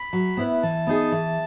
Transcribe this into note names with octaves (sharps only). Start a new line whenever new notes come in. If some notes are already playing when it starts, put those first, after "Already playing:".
Already playing: B5
F#3
B3 E4 B4
E3 A5
B3 D#4 G#4
E3